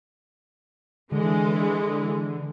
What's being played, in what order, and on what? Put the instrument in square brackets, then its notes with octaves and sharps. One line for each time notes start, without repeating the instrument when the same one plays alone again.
[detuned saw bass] D3 [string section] E3 G#3